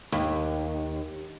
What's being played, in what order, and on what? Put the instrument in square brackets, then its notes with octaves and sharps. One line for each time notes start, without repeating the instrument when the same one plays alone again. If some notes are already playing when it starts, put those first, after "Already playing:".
[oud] D#2